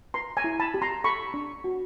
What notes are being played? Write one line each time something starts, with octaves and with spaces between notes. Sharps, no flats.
B4 A#5 C6
G#5 A#5
E4
A5 B5
G4
A#5 C6
A4 B5 C#6
D4
F#4